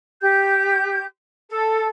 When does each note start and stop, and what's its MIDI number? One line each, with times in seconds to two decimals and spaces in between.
0.21 1.05 67
0.21 1.05 91
1.51 1.89 69